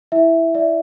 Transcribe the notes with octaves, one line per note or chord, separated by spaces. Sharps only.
E4 E5
D5 E5